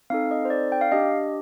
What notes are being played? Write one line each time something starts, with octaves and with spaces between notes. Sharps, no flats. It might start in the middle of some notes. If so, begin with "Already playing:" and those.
C4 D#4 A4 F5
D#5
C5
D5
G5
F5
D4 G4 D#5